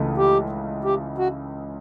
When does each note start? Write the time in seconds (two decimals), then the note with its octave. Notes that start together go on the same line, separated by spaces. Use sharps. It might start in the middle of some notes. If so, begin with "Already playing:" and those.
Already playing: C#2 C#3 E3 A3
0.18 G4
0.84 G4
1.18 F#4